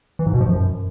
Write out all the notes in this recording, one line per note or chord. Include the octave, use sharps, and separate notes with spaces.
E3
G#2
B2
F3
F#2